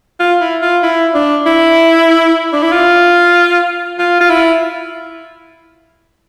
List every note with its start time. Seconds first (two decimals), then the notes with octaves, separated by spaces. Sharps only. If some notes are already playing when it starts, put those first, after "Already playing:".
0.20 F4
0.41 E4
0.62 F4
0.83 E4
1.14 D4
1.46 E4
2.53 D4
2.63 E4
2.72 F4
3.99 F4
4.21 F4
4.30 E4